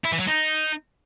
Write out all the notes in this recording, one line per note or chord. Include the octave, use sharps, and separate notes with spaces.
E4
E3
F#3
D#4